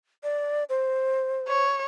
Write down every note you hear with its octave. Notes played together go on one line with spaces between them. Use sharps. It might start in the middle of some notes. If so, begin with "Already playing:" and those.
D5
C5
C#5